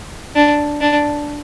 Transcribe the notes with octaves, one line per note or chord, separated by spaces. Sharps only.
D4
D4